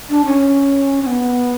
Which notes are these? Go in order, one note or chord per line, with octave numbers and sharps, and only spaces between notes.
D4
C#4
C#4
B3